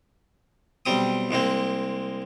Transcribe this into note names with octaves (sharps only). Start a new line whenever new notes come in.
B1 G3 C4 D#6
C2 G#3 A#3 C4